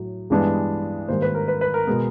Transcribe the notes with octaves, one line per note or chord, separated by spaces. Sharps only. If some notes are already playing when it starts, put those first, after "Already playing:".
Already playing: A2 F#3
G2 E3 G#3 B3 D4
G#2 D#3 G3 A#3 C5
B4
A#4
B4
B4
A#4
B2 G#3 B3